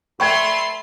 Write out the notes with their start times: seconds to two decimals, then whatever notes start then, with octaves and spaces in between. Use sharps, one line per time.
0.20 A3 B4 D5 G5 C6 C#6